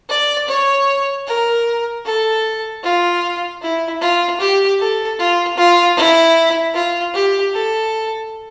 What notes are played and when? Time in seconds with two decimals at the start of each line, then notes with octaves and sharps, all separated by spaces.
0.09 D5
0.48 C#5
1.27 A#4
2.05 A4
2.83 F4
3.62 E4
4.01 F4
4.40 G4
4.80 A4
5.19 F4
5.57 F4
5.97 E4
6.75 F4
7.14 G4
7.53 A4